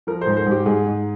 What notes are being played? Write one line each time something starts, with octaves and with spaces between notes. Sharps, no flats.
F3 A#4
C5
G#2
C5
G#2 G4
G#2 G#4
G#2